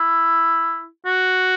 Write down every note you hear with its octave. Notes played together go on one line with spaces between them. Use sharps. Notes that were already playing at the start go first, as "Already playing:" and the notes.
Already playing: E4
F#4